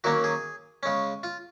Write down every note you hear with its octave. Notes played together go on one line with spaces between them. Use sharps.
D#3 F#3 A#3 C#4 F#4
G#4
C#3 G#3 C#4
F4